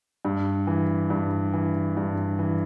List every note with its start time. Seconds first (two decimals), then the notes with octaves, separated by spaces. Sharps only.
0.25 G2
0.67 E3
1.10 G2
1.54 E3
1.97 G2
2.39 E3